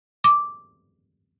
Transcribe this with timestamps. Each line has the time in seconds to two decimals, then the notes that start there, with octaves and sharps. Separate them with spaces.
0.24 D6